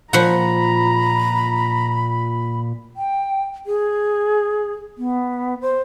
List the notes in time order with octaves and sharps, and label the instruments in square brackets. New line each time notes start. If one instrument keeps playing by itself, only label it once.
[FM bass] A#2 [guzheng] F3 F#5 [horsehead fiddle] A#5 [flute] B5
[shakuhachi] G5
G#4
B3
C5